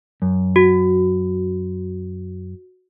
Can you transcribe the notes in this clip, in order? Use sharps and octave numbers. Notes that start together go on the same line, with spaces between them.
F#2
F#4